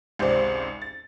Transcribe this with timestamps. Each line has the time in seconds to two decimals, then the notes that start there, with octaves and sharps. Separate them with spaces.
0.19 G#1 C#2 C3 C4 D5
0.82 A6